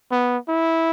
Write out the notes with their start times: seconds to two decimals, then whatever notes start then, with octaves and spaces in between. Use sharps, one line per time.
0.11 B3
0.49 E4